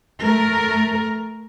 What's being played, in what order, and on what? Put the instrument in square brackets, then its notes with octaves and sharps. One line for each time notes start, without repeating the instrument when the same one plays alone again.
[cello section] A3 A#4